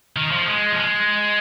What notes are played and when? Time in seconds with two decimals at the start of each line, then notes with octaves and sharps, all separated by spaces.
0.16 D#3
0.31 F3
0.42 A#3
0.47 G#3
0.72 F3
0.78 G#3